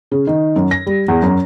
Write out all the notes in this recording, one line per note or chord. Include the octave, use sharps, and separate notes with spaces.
C#3
D#3
F#2
A#6
G3
E2
F#2